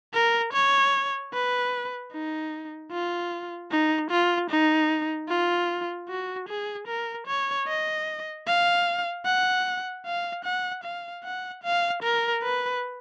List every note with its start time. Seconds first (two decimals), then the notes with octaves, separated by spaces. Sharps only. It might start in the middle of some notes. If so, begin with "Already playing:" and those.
0.14 A#4
0.53 C#5
1.33 B4
2.12 D#4
2.91 F4
3.71 D#4
4.10 F4
4.50 D#4
5.29 F4
6.08 F#4
6.48 G#4
6.87 A#4
7.27 C#5
7.67 D#5
8.47 F5
9.25 F#5
10.05 F5
10.44 F#5
10.83 F5
11.23 F#5
11.63 F5
12.02 A#4
12.42 B4